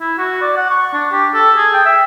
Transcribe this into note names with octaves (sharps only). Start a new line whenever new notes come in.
E4
F#4
D5
F#5
C#6
D4
G4
A4
G#4
G5
E5